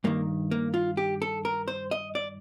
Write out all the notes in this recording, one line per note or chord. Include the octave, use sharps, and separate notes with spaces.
G2 D#3 A#3
A#3
F4
G4
A4
A#4
C5
D#5
D5